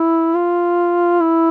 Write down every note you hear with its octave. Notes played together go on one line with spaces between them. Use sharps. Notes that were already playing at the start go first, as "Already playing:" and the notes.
Already playing: E4
F4
E4